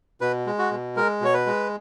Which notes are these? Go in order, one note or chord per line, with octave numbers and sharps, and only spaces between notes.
B2 B4
G#3
F#4
B2
G#3 A#4
B2 C#5
B4
G#3